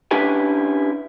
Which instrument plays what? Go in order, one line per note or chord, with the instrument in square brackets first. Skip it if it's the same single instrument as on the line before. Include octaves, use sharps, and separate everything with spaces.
[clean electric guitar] C#4 D4 E4 G4 B4 G#5